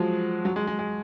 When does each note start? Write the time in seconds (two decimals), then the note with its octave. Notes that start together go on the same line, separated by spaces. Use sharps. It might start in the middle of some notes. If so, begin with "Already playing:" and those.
Already playing: F3 F#3 G#3
0.45 F#3
0.56 G#3
0.67 G#3
0.79 G#3